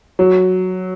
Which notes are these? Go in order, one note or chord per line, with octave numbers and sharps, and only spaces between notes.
F#3